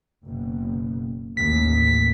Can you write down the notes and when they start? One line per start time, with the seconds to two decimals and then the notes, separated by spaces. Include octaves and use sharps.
0.25 F#1 B2
1.37 A1 D#2 B6